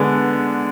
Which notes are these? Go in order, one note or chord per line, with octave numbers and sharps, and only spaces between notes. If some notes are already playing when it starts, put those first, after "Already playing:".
Already playing: D3 G#3 B3 D4